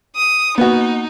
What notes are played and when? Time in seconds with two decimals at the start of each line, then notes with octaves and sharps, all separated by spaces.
0.16 D#6
0.58 A#3 B3 D#4 F#4